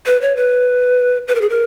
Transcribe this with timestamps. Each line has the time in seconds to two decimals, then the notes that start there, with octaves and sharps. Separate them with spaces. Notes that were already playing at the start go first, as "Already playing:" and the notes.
0.06 B4
0.22 C#5
0.37 B4
1.28 B4
1.35 A#4
1.41 G#4
1.50 A#4